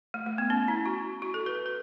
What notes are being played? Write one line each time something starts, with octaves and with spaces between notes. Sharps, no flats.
A3
A3
B3
C#4
E4
F#4
F#4
A4
B4
B4